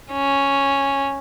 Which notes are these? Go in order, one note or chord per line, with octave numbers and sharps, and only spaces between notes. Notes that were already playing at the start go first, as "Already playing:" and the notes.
C#4